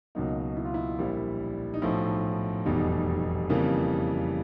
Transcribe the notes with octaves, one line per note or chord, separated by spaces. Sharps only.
C#2 B2 F#3 A#3 D#4
E4
F4
E4
A#1 A#2 G3
D#4
B1 A2 F3 E4
F1 E2 B2 G3 D#4
F2 C#3 E3 G3 A#3